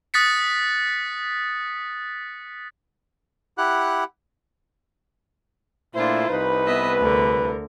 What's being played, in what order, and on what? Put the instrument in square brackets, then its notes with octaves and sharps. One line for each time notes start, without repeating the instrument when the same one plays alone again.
[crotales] D#6 F#6 A6 B6 C#7
[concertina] E4 G4 F#5 F#6
[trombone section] A#2 A3 E4 [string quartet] D4 F4 C5
[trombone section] C2 B4 [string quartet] D#4
[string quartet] B3 D#5 E5
D2 D3 A#4